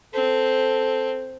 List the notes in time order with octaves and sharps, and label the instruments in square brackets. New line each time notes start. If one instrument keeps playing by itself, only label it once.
[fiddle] C4 [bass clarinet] A4